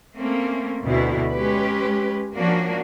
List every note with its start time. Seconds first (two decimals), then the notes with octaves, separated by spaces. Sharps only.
0.16 A3 A#3 C4 C#4
0.84 D2 B2 E4
1.32 G#3 C#4 G4 B4
2.36 F3 A#3 C#4 D4 F#4